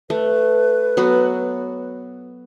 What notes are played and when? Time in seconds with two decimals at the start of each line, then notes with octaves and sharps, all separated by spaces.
0.10 A3 B4
0.97 F#3 B3 F#4